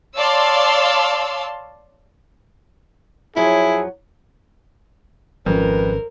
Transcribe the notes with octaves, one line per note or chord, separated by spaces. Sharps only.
C#5 D5 F5 A5 C6 E6
F#2 F3 F#3 E4 G#4
G#1 F2 C#4 A#4 B4